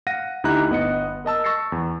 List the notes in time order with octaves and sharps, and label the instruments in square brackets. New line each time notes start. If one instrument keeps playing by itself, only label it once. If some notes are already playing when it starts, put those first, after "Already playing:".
[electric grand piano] F5 F#5 A#6 D#7
D2 D#4 E4 G4 A#5 F#6
G1 B3 D#5 C#7
A#4 D#5 A5 E6
C#6 E6 A6 A#6 C7 C#7
E2